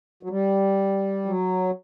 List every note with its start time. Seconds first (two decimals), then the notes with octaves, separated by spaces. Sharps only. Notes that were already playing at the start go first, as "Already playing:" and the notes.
0.23 F#3
0.30 G3
1.26 F#3